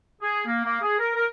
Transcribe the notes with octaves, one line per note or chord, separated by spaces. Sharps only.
G#4
A#3
A#3
G#4
A#4
A#4